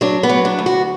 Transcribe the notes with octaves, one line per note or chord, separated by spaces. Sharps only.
F#3 D4
B3
F#3
D4
D2
F#4